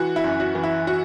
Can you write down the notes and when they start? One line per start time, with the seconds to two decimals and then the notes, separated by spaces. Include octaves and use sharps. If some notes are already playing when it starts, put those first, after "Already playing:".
Already playing: E3 F#4
0.16 E4
0.24 F#2
0.40 F#4
0.55 E3
0.64 E4
0.87 F#4